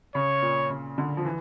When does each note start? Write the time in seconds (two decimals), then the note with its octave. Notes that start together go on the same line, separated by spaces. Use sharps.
0.15 C#3 C#5
0.42 A#2
0.70 C#3
0.98 D3
1.17 F3
1.25 E3